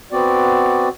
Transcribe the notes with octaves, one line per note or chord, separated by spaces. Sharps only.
B3 C4 F#4 D5